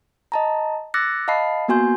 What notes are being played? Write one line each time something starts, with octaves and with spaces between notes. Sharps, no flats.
D#5 A5 A#5
D6 E6 F#6 A6 A#6 C#7
D#5 F5 A5 B5 C7
A#3 B3 F#4 G#5 C6 G6